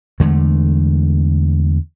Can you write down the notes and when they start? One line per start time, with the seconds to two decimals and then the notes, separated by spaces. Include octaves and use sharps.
0.20 E2 D3 G#3 A3